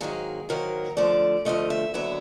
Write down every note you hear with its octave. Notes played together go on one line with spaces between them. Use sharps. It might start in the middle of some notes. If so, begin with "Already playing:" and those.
G#2 D#3 F#3 A#3 G#4
G#2 D#3 F#3 A#3 A#4
D2 D3 F3 A3 D5
D2 D3 F3 A3 D#5
E5
D#2 D3 F#3 B3 E5